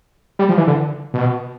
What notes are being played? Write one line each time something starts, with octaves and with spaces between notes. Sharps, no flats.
G3
F3
E3
D3
B2